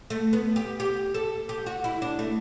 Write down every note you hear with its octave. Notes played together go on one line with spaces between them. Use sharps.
A3
B3
G4
G4
A4
G4
F#4
E4
D4
A3